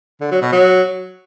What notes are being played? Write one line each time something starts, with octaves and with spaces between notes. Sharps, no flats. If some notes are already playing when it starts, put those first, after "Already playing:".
D3
F#3
B2
F#3